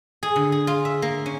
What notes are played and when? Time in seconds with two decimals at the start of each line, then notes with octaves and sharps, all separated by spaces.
0.23 G#4
0.36 D3
0.52 G#4
0.67 F4
0.85 E5
1.02 A#3
1.26 C#4